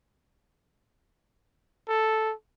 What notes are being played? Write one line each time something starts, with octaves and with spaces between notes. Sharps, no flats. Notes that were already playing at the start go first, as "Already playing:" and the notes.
A4